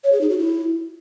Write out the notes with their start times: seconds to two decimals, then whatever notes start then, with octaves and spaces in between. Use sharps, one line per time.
0.04 C#5
0.12 G#4
0.21 D#4
0.30 F#4
0.38 E4